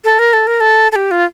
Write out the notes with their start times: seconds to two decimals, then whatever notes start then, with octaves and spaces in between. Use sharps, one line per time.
0.04 A4
0.19 A#4
0.33 A4
0.47 A#4
0.60 A4
0.92 A4
0.96 G4
1.11 F4